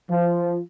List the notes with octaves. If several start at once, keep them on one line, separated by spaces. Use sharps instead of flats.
F3